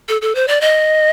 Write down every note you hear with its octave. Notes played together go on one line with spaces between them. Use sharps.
A4
A4
C5
D5
D#5